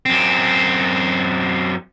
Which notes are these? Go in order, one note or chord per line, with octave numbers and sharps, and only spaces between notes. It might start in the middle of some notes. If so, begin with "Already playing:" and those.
F#2 C4